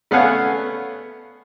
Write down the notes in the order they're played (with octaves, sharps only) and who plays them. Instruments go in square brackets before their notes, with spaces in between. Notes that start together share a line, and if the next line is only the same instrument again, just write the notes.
[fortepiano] A3 B3 C#4 F5 F#5 G#5